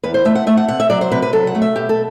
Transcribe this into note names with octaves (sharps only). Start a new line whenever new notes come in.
E2 B4
C5
A3 E5
F#5
A3 E5
F#5
C3 F#5
E5
F#3 D5
C5
C3 B4
B4
F#3 A4
F#5
A3
E5
B2 G4
A4